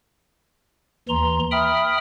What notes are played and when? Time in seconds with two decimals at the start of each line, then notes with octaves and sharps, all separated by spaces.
1.09 D#2 E3 A#5 C6
1.51 E5 G5 B5 D#6 F6